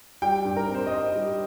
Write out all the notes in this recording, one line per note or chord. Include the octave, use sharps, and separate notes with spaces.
G3 G5
G2
A#4
C4
C5
D#5
D#4 C5
G3